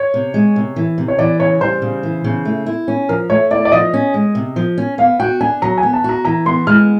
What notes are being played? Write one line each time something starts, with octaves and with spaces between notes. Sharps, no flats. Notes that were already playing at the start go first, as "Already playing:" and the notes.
Already playing: C#5
C3
G#3
C3
E3
C3
C#5
E3 D5
C#3 C#5
G3 C5
C#3
E3
C#3
A3
E4
C#4
F3 A#4
A3 C#5
E4 D5
D5
F3 D#5
C#4
G#3
C3
F3
C#4
B3 F5
F#4 G5
D4 G#5
F#3 A#5
G#5
B3
A5
F#4 A#5
E3 A#5
B3 C6
G#3 F6